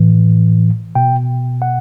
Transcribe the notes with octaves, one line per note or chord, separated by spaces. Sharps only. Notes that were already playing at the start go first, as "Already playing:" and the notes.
Already playing: A2 E3
B2 G5
F#5